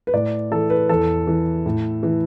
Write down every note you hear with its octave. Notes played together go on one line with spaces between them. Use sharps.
B4
A2 D5
E3 A4
B4
E2 A4
E3
A2
E3